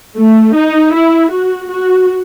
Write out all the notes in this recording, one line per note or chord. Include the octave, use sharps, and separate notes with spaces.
A3
D#4
E4
F#4
F#4